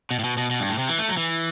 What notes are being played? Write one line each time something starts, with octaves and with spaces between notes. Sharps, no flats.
B2
A2
B2
B2
B2
G2
A2
C3
E3
A3
F#3
E3